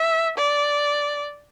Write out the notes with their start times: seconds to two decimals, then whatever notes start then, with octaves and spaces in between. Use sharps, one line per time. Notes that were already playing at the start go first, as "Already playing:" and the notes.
Already playing: E5
0.37 D5